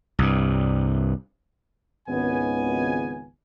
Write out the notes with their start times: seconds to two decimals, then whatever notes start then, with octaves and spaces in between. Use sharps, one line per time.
0.19 C2 G2
2.09 G#1 C#2 B3 G#5